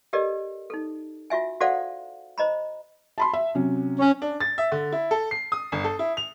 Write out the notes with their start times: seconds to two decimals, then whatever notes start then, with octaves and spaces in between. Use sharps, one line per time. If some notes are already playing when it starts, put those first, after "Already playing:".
0.13 G4 A4 A#4 D5 D#5
0.70 D#4 A4
1.30 F4 F#4 E5 G#5
1.61 F#4 A4 C5 D5 F5 F#5
2.38 C5 D#5 A#5 B5
3.18 A5 B5 C6
3.33 E5
3.55 C3 F#3 C#4
3.99 C#4
4.22 D4
4.41 A6
4.58 E5
4.72 D3
4.92 E4
5.11 A4
5.31 C7
5.52 D#6
5.72 G1
5.84 A4
5.99 E4
6.17 F7